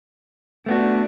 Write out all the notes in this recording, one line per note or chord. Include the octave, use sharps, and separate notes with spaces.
A3 B3 D4 F#4